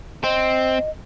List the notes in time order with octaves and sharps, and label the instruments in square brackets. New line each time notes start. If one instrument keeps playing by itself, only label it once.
[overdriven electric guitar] C4 [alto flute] D#5